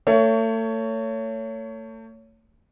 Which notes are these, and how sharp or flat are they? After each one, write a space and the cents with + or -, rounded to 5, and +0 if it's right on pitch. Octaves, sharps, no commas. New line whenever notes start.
A3 +35 C#5 +15